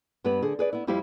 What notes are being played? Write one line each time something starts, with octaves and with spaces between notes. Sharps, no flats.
G2 B3 G4 B4
D3 G#4
G#4 B4 D5
B3 E4
F2 G3 E4 G4 C5 F5